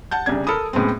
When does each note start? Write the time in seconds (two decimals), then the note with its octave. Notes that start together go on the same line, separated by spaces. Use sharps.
0.11 F#5 A5 G6
0.26 C2 C#3 D4 G#6
0.47 A4 A#4 B5 D#6
0.73 F#2 A2 G#3 B3 C4